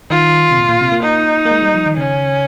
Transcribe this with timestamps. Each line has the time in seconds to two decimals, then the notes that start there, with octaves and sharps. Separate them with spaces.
0.10 D#3 F4
0.51 C3
0.57 A#2
0.69 A#2
0.81 C3
0.92 A#3
1.03 D#4
1.45 A#3
1.51 G#3
1.62 G3
1.75 F3
1.86 D#3
1.97 C#3 C#4